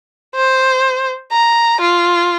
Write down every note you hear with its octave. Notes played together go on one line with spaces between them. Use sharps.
C5
A#5
F4